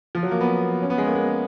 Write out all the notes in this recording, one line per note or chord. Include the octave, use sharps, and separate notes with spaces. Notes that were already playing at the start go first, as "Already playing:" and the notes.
F3
F#3
A#3
B3
C#4
B3
G#3
A#3
G#3